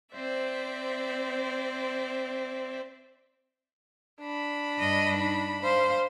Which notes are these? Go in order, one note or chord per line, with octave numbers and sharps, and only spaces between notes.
C4 C5 D5 E5
D4 B5
G2 D#5
D#4
C5 F5